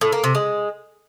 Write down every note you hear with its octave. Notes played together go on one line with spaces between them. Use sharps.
A2
A#3
C3
G#3